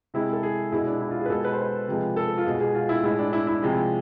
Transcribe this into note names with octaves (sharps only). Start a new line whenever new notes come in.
C3 G#3 E4
A4
G#4
B2 G#3 E4
D4
E4
F4
G#4
B4
B2 G#3 A4
B4
C5
B4
C3 F3 G#3
A4
F4
B2 G#3 G#4
G#4
F4
E4
A2 G#3 E4
D4
E4
E4
C3 F3 G#3 G#4